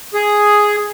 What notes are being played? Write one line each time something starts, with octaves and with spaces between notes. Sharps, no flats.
G#4